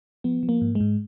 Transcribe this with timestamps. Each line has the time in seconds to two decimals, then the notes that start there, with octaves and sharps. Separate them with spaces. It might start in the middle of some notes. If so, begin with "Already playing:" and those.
0.24 F3 B3
0.43 F3
0.49 A#3
0.61 G#2
0.75 G#3
0.81 G#2